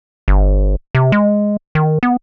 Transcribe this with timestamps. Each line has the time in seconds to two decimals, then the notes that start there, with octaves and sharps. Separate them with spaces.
0.28 G1
0.95 C3
1.12 G#3
1.75 D#3
2.03 B3